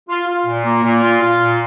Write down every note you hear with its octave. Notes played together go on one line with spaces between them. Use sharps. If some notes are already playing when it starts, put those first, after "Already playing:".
F4
F4
A#2
A#3
A#2
F4
F4
A#2